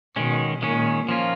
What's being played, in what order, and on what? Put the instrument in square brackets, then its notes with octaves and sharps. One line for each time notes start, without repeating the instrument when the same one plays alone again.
[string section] B2 [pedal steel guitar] D#3 G#3 C#4
[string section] A#2 [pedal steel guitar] D#3 G#3 C#4
[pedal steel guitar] F3 A#3 C#4 F4